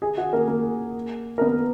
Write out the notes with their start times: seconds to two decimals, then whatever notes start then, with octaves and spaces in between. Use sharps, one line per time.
0.02 G#4 G#5
0.17 F#4 F#5
0.33 A#3 A#4
0.48 A#3 A#4
1.38 A#4
1.41 B3 B4